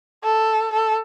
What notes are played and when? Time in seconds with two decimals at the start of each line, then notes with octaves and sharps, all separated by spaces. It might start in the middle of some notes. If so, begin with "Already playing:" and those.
0.24 A4
0.73 A4